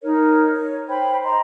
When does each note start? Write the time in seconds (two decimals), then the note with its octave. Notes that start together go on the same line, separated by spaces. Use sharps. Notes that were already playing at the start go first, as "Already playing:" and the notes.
0.02 D#4 A#4 C#5
0.52 C#5
0.88 C5 G5 B5
1.24 D#5 A#5 C6